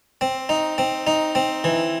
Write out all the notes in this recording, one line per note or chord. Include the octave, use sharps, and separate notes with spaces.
C4
D#4
C4
D#4
C4
E3